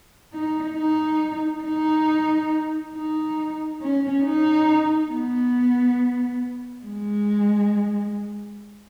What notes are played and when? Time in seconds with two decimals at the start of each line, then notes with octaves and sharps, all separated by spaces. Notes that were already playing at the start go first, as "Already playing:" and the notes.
0.33 D#4
0.76 D#4
1.63 D#4
2.93 D#4
3.81 C#4
4.24 D#4
5.11 B3
6.86 G#3